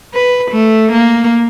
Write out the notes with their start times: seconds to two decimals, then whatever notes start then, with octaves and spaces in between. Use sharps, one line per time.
0.14 B4
0.51 A3
0.92 A#3